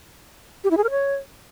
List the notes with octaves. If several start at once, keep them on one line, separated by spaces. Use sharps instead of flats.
G4
E4
G#4
A#4
C#5